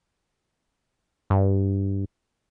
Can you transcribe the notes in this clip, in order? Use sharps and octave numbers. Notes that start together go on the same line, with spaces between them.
G2